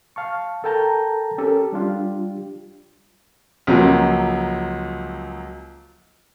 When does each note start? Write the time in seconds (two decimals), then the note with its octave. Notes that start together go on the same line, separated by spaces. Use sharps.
0.16 F5 A5 C#6
0.64 A4 A#4 G5 A5 A#5 G6
1.38 C#4 G4 A4 A#4
1.73 G3 D4 F4 G4
3.67 C#2 F3 F#3 A#3